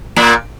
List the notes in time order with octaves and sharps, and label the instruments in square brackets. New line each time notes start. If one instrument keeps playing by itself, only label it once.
[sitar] A#2 A#3